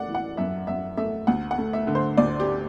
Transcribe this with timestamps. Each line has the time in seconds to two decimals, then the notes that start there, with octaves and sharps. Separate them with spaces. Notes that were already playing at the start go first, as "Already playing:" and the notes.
Already playing: A3 D5 F#5
0.08 E3
0.15 F#5
0.37 F#2 E5
0.67 F#2 E5
0.97 A3 E5
1.27 D2 F#5
1.51 F#5
1.58 A3
1.73 E5
1.87 D3
1.95 C5
2.17 D2 D5
2.40 G4